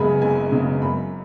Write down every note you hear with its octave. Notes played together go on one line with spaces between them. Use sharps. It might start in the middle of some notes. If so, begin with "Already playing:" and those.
Already playing: F#1 F#2 C#3 G#3 B3 G#5 B5
F#1 G#5
F#2 C#3 G#3 B3
F#2 B5